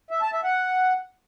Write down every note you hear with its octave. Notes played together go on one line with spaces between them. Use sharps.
E5
A5
E5
F#5